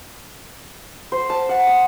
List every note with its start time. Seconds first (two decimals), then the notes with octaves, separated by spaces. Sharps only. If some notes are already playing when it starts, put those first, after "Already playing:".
1.12 C5
1.30 A5
1.49 F#5
1.67 D#6